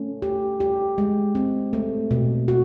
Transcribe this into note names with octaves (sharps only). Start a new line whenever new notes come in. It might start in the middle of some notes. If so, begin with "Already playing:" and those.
Already playing: A3 C#4
G4
G4
G#3
C4
A3
B2
F#4